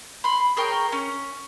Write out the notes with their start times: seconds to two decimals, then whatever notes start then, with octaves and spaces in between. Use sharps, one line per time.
0.24 B5 C6
0.57 G#4 A#4 C#5 G5
0.92 C#4